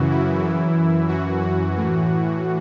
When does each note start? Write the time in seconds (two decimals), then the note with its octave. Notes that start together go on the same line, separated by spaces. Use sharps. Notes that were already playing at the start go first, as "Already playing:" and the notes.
Already playing: F#2 C#3 E3 F#4
0.10 E4
0.44 F#2 E3
1.08 F#2 E3 F#4
1.41 F#4
1.74 A2 E3